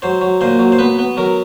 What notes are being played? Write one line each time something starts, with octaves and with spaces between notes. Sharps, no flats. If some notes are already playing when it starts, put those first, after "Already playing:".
F#3 C5
F#3
A#2 C5
F#3
C5
B3 B4
B3
F#3 A#4